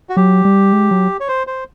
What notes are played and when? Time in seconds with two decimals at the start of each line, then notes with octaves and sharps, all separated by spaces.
0.09 F#4
0.16 F#3 G4
0.45 G3
0.73 G#3
0.91 F#3
1.20 C#5
1.28 C5
1.47 C5